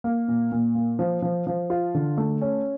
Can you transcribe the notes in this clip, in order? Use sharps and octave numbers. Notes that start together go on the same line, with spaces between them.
A#3
A#2
A#2
A#3
F3
F3
F3
F4
D3
A3
C#4